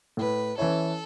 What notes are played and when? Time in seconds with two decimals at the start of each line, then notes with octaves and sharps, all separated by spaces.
0.17 A2 B4
0.58 E3 C#4 E4 A4 C#5